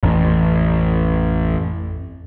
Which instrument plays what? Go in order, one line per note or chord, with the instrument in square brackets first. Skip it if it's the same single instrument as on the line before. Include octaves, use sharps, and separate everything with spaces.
[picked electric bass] A1 [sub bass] F2